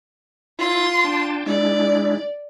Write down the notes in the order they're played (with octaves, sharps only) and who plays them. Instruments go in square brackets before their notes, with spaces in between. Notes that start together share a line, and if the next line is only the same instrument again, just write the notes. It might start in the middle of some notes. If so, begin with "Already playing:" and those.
[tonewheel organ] E4 [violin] F4 C6
[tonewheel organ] D4 G5 A5
[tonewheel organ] G#3 D4 E4 [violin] D5